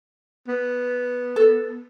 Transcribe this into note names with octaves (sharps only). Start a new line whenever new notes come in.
B3
A4